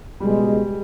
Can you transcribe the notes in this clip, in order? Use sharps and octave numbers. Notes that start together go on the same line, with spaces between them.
C#2 B2 G3 G#3